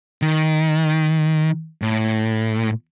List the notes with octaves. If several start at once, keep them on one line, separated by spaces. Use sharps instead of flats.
D#3
A2